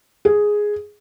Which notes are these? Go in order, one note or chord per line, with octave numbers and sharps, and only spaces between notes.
G#4